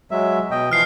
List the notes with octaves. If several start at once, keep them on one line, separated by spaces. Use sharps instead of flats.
F#3 G#3 E5
B2 D#5 G5
E3 F3 F6 C7